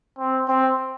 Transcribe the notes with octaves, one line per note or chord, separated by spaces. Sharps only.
C4
C4